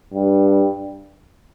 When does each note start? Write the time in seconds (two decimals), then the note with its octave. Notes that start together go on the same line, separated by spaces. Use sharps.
0.14 G2